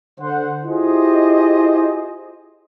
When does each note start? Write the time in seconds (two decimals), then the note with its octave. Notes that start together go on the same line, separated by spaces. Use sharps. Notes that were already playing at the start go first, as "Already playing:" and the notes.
0.20 D3 C5 F#5
0.64 E4 F4 G4 G#4 C5 D#5